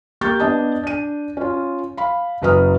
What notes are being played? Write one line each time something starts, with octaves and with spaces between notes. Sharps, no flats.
A#3 G4 C#6 G6 A6
B3 D4 D#5 A5 D#6
D4 D#7
C#4 F4
F5 B5
F#1 F#3 B4 A#5 D#6 F6